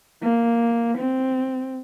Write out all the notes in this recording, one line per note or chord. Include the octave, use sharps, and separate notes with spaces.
A#3
C4